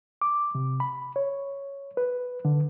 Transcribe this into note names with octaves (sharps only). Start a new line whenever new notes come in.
D6
C3
B5
C#5
B4
D3